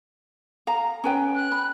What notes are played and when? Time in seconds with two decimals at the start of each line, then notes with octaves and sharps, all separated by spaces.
0.67 F5 A#5
1.04 C#4 B4 G5
1.35 F#6
1.52 B5